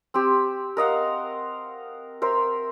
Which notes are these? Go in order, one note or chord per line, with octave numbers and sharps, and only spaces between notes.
C4 G4
A#4 D#5 F5 F#5
A#4 C5 E5